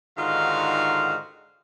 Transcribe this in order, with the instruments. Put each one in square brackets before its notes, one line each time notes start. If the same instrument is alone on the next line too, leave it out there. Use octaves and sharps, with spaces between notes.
[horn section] G#2 D3 D#3 F4 F#4 F5